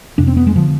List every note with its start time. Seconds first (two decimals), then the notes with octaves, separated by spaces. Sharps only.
0.18 F2 C3 D4
0.27 C4
0.37 B3
0.47 G#3
0.56 D3 F3